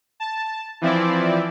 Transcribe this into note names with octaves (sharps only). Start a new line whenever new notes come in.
A5
E3 F3 C4 E4 D5